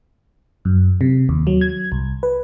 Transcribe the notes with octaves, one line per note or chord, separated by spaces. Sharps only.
F#2
C3
D#2
F#3
G#6
C2
B4